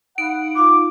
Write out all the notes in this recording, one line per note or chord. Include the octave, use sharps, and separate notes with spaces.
D#4 F5 F#5 B5 D7
D#4 F4 F5 D6